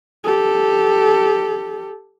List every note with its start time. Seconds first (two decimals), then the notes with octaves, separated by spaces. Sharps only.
0.24 G4 A4